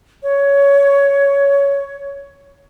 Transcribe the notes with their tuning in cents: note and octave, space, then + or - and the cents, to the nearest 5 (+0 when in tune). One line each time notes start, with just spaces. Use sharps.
C#5 +15